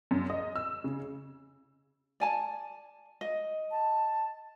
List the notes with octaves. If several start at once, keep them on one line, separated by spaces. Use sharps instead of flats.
F#2
D#5
E6
C#3
D5 G#5 A5
D#5
A5